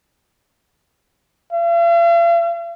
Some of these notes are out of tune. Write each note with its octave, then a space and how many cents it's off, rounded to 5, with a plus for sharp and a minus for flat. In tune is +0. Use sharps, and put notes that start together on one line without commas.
F5 -45